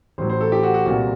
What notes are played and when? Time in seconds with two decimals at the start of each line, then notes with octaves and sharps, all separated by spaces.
0.18 A1 A2 F#3 C5
0.30 C5
0.41 A4
0.52 G4
0.63 F#4
0.74 F#4
0.86 C2 A#2 F#3 F#4